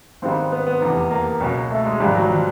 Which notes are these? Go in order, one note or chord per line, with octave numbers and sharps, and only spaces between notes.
G#1 G#2 D#3 G3 B3 C4
B3
B3
F1 E2 C3
A#3
C#2 B2 F#3
A3
G#3
G#1 G#2 F3 G3
F#3
F3